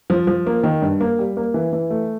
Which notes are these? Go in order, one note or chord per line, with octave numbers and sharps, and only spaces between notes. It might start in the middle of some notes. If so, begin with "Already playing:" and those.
F3
F3
A#3
D#3
G2
A#3
G3
A#3
E3
E3
A3